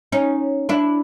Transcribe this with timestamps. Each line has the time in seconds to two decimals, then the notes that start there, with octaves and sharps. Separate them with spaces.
0.12 C#4 D#4
0.69 D4 E4